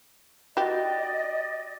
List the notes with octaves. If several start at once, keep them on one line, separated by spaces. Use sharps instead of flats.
F#4 G4 D5 D#5